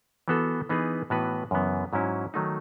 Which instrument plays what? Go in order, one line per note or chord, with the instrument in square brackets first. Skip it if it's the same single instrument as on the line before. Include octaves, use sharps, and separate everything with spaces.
[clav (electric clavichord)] E3 B3 F#4 A4
E3 B3 D#4 G#4 B4
A2 E3 B3 F#4 B4
F#2 C#3 E3 B3
G#2 F#3 C#4 E4
D#3 F#3 A3 D#4